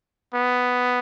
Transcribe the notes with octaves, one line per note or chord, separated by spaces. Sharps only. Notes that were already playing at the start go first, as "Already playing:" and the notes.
B3